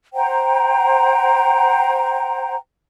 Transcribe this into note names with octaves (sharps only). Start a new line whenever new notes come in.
C5 F#5 G5 A#5